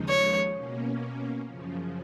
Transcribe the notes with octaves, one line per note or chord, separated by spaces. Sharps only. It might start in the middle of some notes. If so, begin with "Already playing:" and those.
Already playing: D#2 C#3 F3 G#3 D#4
C#5
B2 A#3 C#4
F#2 C#3 F3